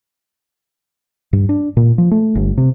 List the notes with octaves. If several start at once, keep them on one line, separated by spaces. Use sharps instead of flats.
G2
D4
A#2
F3
A3
G1
C3